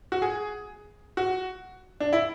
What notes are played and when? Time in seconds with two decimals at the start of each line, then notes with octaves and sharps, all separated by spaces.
0.12 F#4
0.22 G#4
1.17 F#4
2.00 D4
2.13 E4